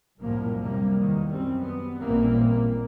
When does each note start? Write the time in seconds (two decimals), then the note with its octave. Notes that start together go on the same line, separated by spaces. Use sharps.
0.19 C2 F#2 A2 F3 G3 A#3
0.58 C3 G3 A#3
0.99 E2 D#3
1.29 F#2 G3 C4
1.60 B3
1.99 A1 A#2 E3 G3 A#3 C4